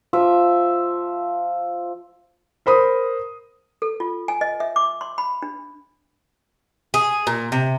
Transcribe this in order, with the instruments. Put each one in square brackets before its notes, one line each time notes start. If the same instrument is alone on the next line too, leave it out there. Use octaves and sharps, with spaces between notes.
[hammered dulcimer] F3 E5
[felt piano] A#4 C5 B5 D#6
[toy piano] A4
F4
G#5
D#5
E5
D6
C6
B5
D4
[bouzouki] G#4
A#2
C3